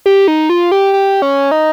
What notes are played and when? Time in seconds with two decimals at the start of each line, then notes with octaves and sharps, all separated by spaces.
0.06 G4
0.28 D#4
0.49 F4
0.72 G4
0.94 G4
1.22 C#4
1.51 D#4